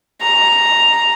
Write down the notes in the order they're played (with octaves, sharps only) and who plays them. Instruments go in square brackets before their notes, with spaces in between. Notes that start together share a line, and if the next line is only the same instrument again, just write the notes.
[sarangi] A#5